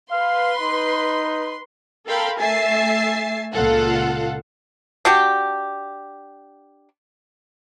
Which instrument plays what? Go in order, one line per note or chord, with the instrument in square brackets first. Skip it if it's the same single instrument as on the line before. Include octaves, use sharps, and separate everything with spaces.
[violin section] B4 C6 [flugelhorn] F5
[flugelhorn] D#4
[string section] A4 A#4 F5 G5 B5 C6
A3 E5 G#5 A6 C7
C#2 A#2 F4 A4 F5 F#5
[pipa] D4 F#4 G4